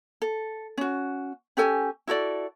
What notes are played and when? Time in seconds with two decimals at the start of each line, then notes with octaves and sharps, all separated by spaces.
0.22 A4
0.78 C#4 F#4
1.57 C#4 G4 A4 G#5
2.07 E4 F#4 A4 D5